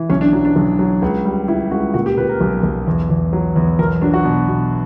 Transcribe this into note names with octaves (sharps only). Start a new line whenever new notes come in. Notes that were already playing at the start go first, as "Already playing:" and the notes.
Already playing: E3
B1 C#4
D4
F#3
D4
B1
F#3
C#2
G3
G3 E4
C#2 F#4
A#2 F#4
G4
A#2 B4
A#4
B1
B1
E2
E2
F#3
E2
B1 A#4
F#3 D4
F#4
B2
B2